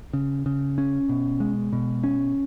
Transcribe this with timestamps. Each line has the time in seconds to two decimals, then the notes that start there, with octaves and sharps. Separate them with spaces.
0.13 C#3
0.46 C#3
0.78 C#4
1.09 B2
1.40 G#3
1.73 B2
2.04 C#4